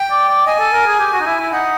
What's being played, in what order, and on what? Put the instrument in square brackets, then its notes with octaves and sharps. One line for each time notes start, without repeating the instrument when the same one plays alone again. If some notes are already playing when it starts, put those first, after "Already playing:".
Already playing: [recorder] G5
[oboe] D5
D5
[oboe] D#5 [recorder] G#5
[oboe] A4
A#4
G#4
G4
F#4
D#4
E4
E4
[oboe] D#4 [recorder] F#5